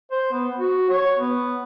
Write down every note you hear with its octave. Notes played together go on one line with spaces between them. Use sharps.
C5
B3
F#4
C#5
B3